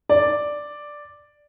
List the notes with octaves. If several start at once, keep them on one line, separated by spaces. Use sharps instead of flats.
D5